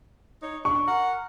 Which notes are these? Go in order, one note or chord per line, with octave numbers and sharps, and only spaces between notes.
D#4 C#5
D4 C#6
A#4 F#5